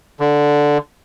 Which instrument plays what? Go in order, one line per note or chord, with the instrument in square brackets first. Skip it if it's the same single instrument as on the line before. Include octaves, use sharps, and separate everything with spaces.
[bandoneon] D3